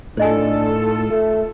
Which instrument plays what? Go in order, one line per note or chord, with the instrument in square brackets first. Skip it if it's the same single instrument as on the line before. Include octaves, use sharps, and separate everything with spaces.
[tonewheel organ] A2 [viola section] D#3 F4 A4 [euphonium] D4 [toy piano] C5 D#5 G#5
[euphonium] A3